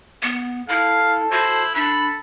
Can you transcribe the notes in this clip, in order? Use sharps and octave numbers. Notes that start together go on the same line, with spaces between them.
B3
E4 A4 F5
E4 F#4 C5
D4 A4 B5